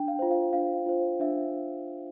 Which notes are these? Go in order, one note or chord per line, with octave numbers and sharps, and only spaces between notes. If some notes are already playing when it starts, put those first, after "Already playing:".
Already playing: D4 G5
F5
F4 C5
F5
D4 F5
F4 C5
D4 E5